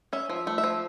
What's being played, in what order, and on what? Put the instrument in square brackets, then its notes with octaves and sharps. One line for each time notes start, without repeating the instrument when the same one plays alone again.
[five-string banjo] C#4 E5
F3
E5
A3
E5
F3